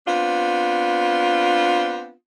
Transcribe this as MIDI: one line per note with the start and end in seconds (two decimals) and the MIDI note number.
0.07 2.12 59
0.07 2.12 60
0.07 2.12 62
0.07 2.12 65